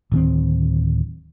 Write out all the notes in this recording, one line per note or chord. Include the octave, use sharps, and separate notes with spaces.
D1 D#3 C4